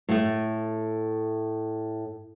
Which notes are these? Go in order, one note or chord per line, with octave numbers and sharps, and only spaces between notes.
A2 A3